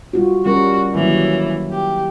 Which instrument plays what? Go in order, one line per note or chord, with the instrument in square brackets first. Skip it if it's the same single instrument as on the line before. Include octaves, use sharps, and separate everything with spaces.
[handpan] G3 F4 F#4
[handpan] G3 C#4 A#4 [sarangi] F#4
[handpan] D#3 F#3 A#3 [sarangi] E3
[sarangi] G4